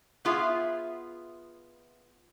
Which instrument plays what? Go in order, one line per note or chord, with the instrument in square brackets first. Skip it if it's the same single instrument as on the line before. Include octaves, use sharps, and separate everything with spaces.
[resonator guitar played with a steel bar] B3 F4 G#4 E5